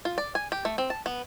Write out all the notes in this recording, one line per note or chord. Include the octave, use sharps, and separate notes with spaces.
F4
D5
G#5
G4
A3
C4
A5
B3